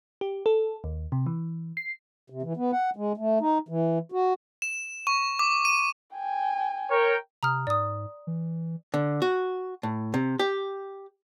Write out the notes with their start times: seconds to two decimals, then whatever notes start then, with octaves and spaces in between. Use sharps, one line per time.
0.21 G4
0.46 A4
0.84 D#2
1.12 C3
1.26 E3
1.77 C7
2.30 C3
2.42 E3
2.57 B3
2.72 F#5
2.96 G#3
3.17 A3
3.40 D#4
3.69 E3
4.12 F#4
4.62 E7
5.07 C#6
5.39 D6
5.65 D#7
6.15 G5 G#5
6.91 A#4 C#5 G5
7.43 C3 A#5 D#6 F6
7.67 G#2 D5 D#6
8.27 E3
8.94 D3
9.22 F#4
9.83 A2
10.14 C3
10.39 G4